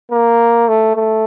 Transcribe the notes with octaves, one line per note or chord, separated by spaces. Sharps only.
A#3
A3
A3